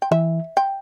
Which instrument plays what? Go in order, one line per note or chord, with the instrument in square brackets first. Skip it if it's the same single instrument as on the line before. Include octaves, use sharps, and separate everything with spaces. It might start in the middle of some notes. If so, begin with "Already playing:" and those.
[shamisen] G5
[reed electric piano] E3 [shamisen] E5
[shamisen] G5